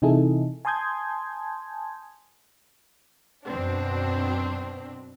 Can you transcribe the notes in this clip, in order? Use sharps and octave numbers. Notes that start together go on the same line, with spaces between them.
C3 E3 D#4 E4 G#4 A4
G#5 A5 C6 D#6 G6 G#6
F#2 B2 C4 D4